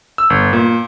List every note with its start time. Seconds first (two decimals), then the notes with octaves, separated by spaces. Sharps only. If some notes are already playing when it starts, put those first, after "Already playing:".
0.18 E6
0.30 G1
0.53 A#2